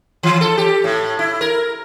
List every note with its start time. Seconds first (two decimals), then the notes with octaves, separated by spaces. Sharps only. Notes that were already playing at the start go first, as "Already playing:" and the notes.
0.23 E3
0.41 A4
0.58 G4
0.84 A2
1.19 E4
1.41 A#4